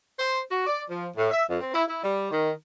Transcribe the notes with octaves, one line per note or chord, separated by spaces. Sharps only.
C5
F#4
D5
F3
A2
E5
F2
C4
E4
E4
G3
D#3